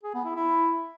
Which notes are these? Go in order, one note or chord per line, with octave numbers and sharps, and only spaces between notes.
G#4
B3
E4
E4